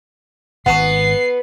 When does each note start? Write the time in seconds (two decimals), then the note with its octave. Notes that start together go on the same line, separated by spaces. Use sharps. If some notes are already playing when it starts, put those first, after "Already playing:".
0.66 G#1 G#2 B3 F#5 A5 C#6 C7